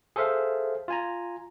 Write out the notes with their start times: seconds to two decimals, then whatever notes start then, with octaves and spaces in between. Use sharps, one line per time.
0.16 G#4 A4 C5 E5 F5
0.88 F4 G#5 A#5